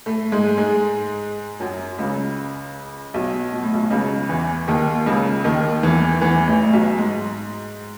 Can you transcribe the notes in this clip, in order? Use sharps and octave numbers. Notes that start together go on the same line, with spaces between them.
A2 A3
G#2 G#3
G#2 G#3
F#2 F#3
C#2 C#3
B1 B2
B2
A2
B1 B2
C#2 C#3
E2 E3
D#2 D#3
C#2 C#3
D#2 D#3
E2 E3
E2 E3
A1 A2
B1 B2
G#2